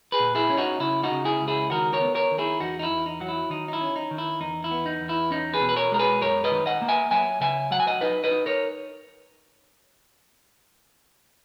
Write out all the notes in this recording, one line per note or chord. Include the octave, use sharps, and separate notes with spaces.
G#4 B4
A#2
E4 G#4
C#4
D#4 F#4
C#3 E4
D#4 F#4
C#3
E4 G#4
C#2
E4 G#4
D#3 F#4 A#4
A#4 C#5
B3
A#4 C#5
D#3
E4 G#4
E2 D#4 F#4
D#4
E4
E2
D#4
F#3 F#4
E4
D#3 D#4
D#4
E4
C#4
D#4
D#3
E4
E2 D#4
E4
B3
D#4
E2
E4
C#4 D#4
G#4 B4
B2
B4
A#4 C#5
G#3 A#4
G#4 B4
F#2 A#4 C#5
B4 D#5
D#3
D#5 F#5
A#3
E5 G#5
F#3 E5 G#5
C#3 E5 G#5
F#3 F#5
G#5
D#5 F#5
D#4 B4 D#5
B4 D#5
D#4
A#4 C#5